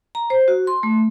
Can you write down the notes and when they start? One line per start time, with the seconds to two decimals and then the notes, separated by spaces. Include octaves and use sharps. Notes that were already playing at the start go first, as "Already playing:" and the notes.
0.15 A#5
0.30 C5
0.48 F#4
0.67 C6
0.83 A3